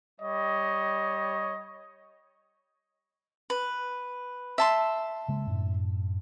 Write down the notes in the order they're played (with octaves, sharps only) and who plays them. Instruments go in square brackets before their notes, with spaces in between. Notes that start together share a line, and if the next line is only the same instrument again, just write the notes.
[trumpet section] G3 C#5 D#5
[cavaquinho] B4
E5 A5 C6
[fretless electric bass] C#3 G#3 A#3
F#2 A2